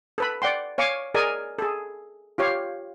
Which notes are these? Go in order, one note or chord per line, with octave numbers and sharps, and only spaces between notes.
A4 B4 B5
D5 F#5 G5 C6
C#5 F5 G#5 C#6 D6
G#4 A#4 D5 D#5 G#5
G#4 A4
F4 G4 C#5 F5